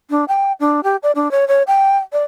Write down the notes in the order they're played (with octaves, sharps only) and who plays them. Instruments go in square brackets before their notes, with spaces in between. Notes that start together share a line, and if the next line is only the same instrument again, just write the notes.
[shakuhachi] D4
G5
D4
G4
D5
D4
C#5
C#5
G5
D5